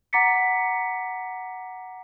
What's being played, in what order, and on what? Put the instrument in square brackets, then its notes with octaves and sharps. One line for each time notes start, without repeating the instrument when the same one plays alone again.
[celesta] F#5 A#5 D6 A6 B6 C#7